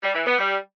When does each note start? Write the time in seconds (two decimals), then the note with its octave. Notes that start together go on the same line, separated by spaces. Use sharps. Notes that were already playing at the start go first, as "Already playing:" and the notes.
0.02 G3
0.14 E3
0.26 B3
0.38 G3